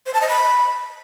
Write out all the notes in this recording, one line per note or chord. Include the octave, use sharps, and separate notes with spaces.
C5
A5
D#5
B5